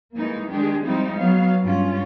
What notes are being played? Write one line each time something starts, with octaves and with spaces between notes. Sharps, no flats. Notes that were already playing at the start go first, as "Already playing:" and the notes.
E3 G3 G#3 A#3 D#4
D#3 G#3 D4 G4 G#4
F3 G3 G#3 C4 D#4 E4
F#3 B3 F5
G2 G3 C#4 F4